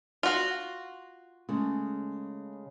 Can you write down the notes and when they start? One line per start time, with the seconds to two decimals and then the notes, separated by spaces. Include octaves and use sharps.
0.23 F4 F#4
1.49 C#3 G#3 A3